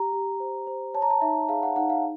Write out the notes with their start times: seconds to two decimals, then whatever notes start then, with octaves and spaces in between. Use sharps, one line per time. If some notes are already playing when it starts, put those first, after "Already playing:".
Already playing: G4 A#5
0.13 G4
0.40 C5
0.67 C5
0.94 C#5 A5
1.02 A#5
1.10 A5
1.22 D#4 E5
1.49 G#4 F5
1.63 F#5
1.76 D#4 F#5
1.90 F5